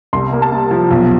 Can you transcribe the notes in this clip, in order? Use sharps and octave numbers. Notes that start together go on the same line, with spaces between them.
C2 C6
A#3
A5
C3
F3
B1